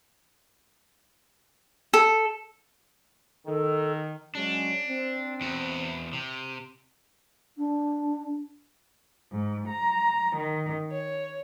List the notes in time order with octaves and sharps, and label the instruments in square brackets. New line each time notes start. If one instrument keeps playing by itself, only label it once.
[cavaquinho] A4
[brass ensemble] D#3 [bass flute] A4
[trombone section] F#3 G#3 C#4 [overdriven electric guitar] D4
[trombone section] C4
[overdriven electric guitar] E2 F#4
C3
[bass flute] D4
[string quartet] G#2
A#5
D#3
C#5